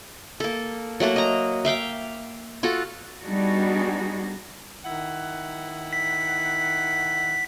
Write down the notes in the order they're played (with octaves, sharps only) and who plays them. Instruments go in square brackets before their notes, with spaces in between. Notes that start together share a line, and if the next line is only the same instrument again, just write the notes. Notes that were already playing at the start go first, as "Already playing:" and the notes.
[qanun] A#3 A4
F#3 A3 A#3 F#4
D#5 A#5
E5 F5 G5 D6
F4 F#4 A4
[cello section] G3 B3 D4 D#4 F#4 G#4
[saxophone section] D#3 E4 F#5
[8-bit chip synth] B6